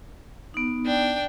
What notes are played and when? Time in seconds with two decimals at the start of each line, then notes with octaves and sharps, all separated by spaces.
0.54 B3 D#4
0.86 D4 G5